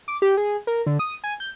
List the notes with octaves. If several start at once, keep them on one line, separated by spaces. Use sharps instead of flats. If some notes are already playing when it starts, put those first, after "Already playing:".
D6
G4
G#4
A#4
D3
D#6
G#5
G6